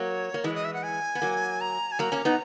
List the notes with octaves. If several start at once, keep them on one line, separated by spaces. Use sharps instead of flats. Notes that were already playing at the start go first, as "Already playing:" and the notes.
Already playing: F#3 A#3 C#5
A#3
E3 G#3 D#5
D#5
E5
F#5
G#5
B3
F#3 A#3
A#5
G#5
F#3 A#3 A#5
A#3 C#4
B3 D#4